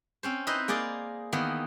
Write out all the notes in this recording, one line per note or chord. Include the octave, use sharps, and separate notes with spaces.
C4 C#4 C5
D#4 E4 B4 C5 D#5
A#3 G#4 D5 D#5 F5
D#3 E3 A#3 B3